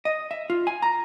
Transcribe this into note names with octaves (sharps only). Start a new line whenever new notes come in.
D#5
E5
F4
G#5
A#5